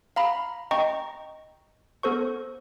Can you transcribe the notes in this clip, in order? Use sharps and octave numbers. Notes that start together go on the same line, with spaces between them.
F5 A#5 B5
D#5 G5 A#5 C#6
B3 A4 C5 C#6